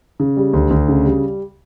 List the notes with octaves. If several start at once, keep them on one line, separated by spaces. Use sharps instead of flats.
C#3
G3
D2
D2
C#3
G3